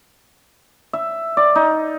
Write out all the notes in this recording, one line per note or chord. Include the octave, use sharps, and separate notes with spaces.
E5
D5
D#4